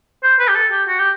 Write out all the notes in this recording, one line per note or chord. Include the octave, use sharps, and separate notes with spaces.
C5
B4
G4
A4
G4
F#4
G4